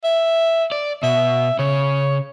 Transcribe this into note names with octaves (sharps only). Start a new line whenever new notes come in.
E5
D5
B2 E5
C#3 C#5